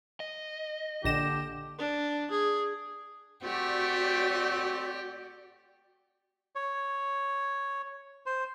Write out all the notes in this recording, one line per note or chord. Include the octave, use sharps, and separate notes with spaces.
D#5
A#1 D3 G4 A#6 E7
D4
G#4
A3 C4 F#4 G4 D5
C#5
C5